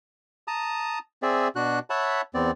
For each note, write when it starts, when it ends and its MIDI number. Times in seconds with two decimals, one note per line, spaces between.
0.48 0.99 81
0.48 0.99 82
0.48 0.99 87
1.23 1.48 60
1.23 1.48 68
1.23 1.48 74
1.23 1.48 76
1.56 1.79 47
1.56 1.79 62
1.56 1.79 66
1.56 1.79 90
1.90 2.21 73
1.90 2.21 76
1.90 2.21 78
1.90 2.21 81
1.90 2.21 83
2.35 2.51 40
2.35 2.51 59
2.35 2.51 60
2.35 2.51 74